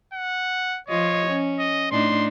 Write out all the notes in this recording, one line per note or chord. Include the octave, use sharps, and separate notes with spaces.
F#5
F3 F4 C#5 D#5
C#4
D#5
A2 D4 D#4 C6